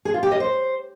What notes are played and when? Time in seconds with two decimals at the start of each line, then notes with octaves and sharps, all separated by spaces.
0.05 G#4
0.14 F4
0.23 G4
0.31 D#5
0.40 C5